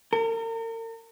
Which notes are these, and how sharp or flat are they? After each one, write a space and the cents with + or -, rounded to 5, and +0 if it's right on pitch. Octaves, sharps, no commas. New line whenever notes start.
A#4 -40